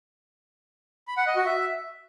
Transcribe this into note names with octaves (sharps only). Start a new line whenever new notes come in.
B5
F#5
D#5
F#4
E5